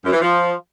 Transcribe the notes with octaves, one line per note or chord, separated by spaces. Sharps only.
F#2
E3
F3